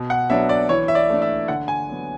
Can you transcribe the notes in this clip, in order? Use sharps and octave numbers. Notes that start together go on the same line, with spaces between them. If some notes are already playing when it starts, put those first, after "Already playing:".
Already playing: B2
F#5
F#3 B3 D4 E5
D5
E3 C#5
E5
D5
A3 D4
E5
D3 F#5
G#5
F#3 B3